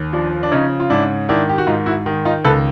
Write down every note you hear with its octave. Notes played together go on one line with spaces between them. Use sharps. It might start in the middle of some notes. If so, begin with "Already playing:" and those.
Already playing: D#2
F3 D4
D4
C#3 C#4 D#4
F4
G#2 D4 E4
D#3 D4 E4
G4
F#4
G#2 D#4 F4
E4 F#4
D#3
D#4 F4
C#2 A4 B4